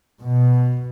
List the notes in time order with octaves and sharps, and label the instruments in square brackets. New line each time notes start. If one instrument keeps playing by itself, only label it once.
[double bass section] B2